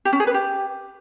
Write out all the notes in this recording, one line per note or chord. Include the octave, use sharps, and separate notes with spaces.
G4
C#4
G#4
B4
G4